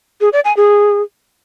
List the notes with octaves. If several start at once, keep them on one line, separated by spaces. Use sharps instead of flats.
G#4
D5
G#5
G#4